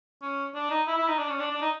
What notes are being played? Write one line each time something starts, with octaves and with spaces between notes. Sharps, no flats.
C#4
D4
D#4
E4
E4
D#4
D4
C#4
D4
D4
D#4